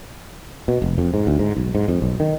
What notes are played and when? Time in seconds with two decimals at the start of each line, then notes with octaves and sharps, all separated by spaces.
0.68 B2
0.82 F1
0.98 F2
1.14 G#2
1.27 D2
1.39 G#2
1.57 B1
1.75 G#2
1.88 F2
2.02 B1
2.20 D#3